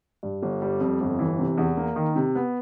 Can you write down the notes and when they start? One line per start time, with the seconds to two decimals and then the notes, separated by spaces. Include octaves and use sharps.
0.23 G2
0.42 G1
0.62 G3
0.80 F2
1.00 G1
1.19 E3
1.39 C3
1.58 E2
1.77 A#3
1.96 D#3
2.16 C3
2.35 B3